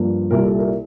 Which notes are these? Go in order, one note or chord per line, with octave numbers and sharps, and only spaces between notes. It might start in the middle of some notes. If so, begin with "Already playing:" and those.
Already playing: G2 F3 A#3
C2 A#2 G3 A#4
A4
A#4